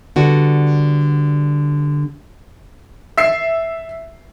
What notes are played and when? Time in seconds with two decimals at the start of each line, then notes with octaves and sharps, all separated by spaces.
0.16 D3 G3 B3 F#4
3.18 E5 C7